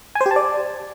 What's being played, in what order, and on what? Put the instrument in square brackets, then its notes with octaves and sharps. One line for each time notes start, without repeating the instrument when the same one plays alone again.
[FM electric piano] G#5
C5
G4
A5
D5